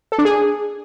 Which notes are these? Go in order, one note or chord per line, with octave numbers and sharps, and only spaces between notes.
A4
D4
G#4